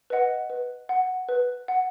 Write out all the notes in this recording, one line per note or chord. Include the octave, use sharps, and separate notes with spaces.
B4 D#5 F#5
B4
F#5
B4
F#5